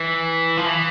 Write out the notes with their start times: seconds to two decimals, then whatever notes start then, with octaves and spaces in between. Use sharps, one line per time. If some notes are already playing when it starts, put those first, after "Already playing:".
Already playing: E3
0.57 F3
0.66 E3